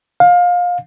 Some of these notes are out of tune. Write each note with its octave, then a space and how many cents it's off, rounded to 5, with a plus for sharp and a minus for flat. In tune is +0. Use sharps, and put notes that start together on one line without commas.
F5 +25